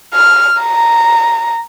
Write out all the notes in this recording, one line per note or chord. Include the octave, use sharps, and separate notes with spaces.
F6
A#5